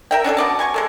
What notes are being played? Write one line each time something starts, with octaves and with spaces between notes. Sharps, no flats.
A#4 E5 G5
C#4 D4 G4 A4
B2 D5 A5
B2 G#5 C#6
G#3 B3 A4